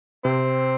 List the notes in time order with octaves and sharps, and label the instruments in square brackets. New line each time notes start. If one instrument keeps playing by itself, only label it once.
[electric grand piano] C3 [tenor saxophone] C4